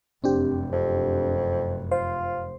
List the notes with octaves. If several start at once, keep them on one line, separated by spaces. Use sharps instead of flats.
F1 F#2 C4 D4 G4
F2
F4 C5